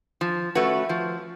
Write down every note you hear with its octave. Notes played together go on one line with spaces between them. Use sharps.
F3
A3 C#4 F#4 B4
F3